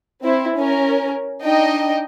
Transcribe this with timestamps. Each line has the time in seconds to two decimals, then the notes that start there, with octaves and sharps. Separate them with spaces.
0.23 C4 E4
0.56 C#4 A#4
1.42 D4 D#4 D#5 G5